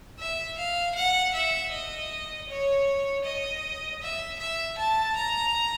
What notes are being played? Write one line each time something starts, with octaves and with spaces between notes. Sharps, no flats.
E5
F5
F#5
E5
D#5
C#5
D#5
E5
E5
A5
A#5